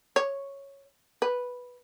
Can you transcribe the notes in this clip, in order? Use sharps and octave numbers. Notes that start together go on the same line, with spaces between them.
C#5
B4